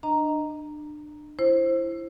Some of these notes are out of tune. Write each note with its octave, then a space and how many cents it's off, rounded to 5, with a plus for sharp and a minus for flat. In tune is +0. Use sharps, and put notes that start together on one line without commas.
D4 +30 D#5 +0 A#5 +0
E4 +20 C5 +15